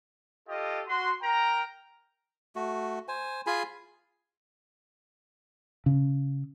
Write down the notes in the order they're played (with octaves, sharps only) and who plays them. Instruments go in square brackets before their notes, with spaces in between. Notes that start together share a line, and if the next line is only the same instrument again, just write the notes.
[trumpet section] F4 G4 A4 D#5
F#4 C6
A#4 G5 A#5
[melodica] A3 F#4
C5 G#5
F4 G#4 G#5 B5
[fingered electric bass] C#3